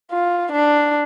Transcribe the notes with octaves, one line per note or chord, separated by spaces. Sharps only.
F4
D4